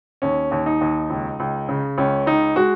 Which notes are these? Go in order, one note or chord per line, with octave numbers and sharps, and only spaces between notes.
D#2 C#4
D#2
D#4
D#2
C#2
C#2
C#3
C#2 C#4
C#2 D#4
G#3 F#4